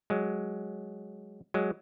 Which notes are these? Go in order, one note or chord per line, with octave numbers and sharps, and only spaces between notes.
F#3 G#3
F#3 G#3